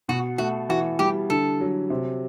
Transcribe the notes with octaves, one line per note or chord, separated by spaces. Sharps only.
B2 F#4
A3 F#4
E3 F#4
G3 G4
D3 A4
F#3
C3